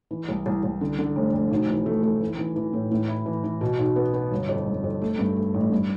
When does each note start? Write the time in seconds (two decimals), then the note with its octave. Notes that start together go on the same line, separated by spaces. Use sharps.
0.11 E3
0.29 C2
0.46 C2
0.63 C2
0.81 D3
0.99 D3
1.16 F1
1.34 F1
1.51 B1
1.68 E3
1.86 A3
2.03 A3
2.21 E3
2.39 E3
2.56 E3
2.73 A2
2.91 A2
3.08 E4
3.26 E3
3.44 E3
3.61 B2
3.79 B1
3.96 B3
4.14 B3
4.31 G1
4.49 F2
4.66 G1
4.84 F2
5.02 A3
5.19 G2
5.36 A3
5.54 A1
5.72 G2